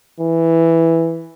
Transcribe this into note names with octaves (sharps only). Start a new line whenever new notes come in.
E3